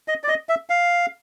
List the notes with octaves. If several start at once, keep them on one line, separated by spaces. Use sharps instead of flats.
D#5
D5
D#5
E5
F5